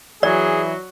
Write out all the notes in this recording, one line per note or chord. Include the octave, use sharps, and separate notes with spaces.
E3 F#3 G#4 D5